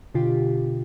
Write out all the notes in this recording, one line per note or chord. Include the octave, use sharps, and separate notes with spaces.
B2 D3 F4 G4